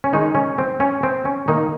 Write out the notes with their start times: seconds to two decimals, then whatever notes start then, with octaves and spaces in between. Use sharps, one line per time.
0.04 C#4
0.13 D#3 G#3 D#4
0.35 C#4
0.58 C4
0.80 C#4
1.03 C4
1.25 C#4
1.48 D#3 A#3 D#4